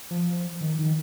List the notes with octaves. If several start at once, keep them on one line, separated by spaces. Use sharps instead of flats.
F3
D#3
D#3